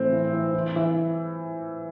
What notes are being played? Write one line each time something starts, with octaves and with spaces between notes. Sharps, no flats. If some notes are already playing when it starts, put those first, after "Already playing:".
Already playing: A2 E3 C4 E4
E3
E3
E3
E3